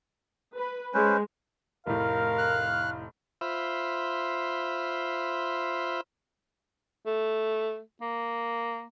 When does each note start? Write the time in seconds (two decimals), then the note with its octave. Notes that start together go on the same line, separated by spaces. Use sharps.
0.55 B4
0.94 G#3 C#4 B4 C5
1.87 F1 A2 A#4 F5
2.38 F6 F#6
3.41 F4 C5 E5 B5
7.06 A3
8.01 A#3